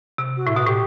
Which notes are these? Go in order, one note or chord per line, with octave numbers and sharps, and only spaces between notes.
C3
F#4
A2 E4
B2 F#4
A2 G4